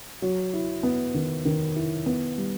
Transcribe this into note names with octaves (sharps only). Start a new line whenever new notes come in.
F#3
E4
B3
D#3
D#3
E4
B3
G3